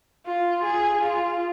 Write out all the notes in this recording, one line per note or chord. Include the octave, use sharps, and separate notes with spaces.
F4
G#4
F4